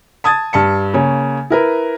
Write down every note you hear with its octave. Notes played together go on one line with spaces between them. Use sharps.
A5 D#6 G#6 A6
G2 A5 C#7
C#3 A#3 C#5
E4 A#4 B4